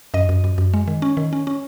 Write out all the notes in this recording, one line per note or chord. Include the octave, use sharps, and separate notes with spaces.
F#2 D#5
F#2
F#2
F#2
G#3
D#3
C#4
D#3
C#4
C#4